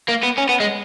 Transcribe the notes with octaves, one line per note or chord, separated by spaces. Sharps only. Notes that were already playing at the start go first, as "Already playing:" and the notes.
A#3
B3
C#4
B3
G#3